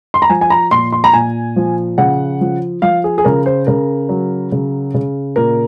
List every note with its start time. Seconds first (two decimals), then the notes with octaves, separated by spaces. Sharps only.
0.14 C6
0.22 A#5
0.30 F3 G#5
0.41 G#5
0.50 A#5
0.71 A#2 C6
0.93 C6
1.04 A#5
1.13 A#2 G#5
1.56 F3
1.98 C#3 F#5
2.41 F3
2.82 F3 F5
3.04 G#4
3.18 G#4
3.24 C#3 A#4
3.46 C5
3.67 C#3 A#4
4.09 F#3
4.52 C#3
4.94 C#3
5.36 A#2 A#4